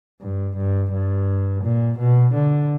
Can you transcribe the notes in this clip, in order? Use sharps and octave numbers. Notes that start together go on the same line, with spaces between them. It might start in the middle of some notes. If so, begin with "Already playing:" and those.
G2
G2
G2
A#2
B2
D3